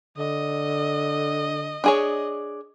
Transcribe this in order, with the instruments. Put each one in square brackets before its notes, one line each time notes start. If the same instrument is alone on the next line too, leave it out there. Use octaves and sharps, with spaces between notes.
[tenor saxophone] D3 [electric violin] D#5
[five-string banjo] D4 G#4 C#5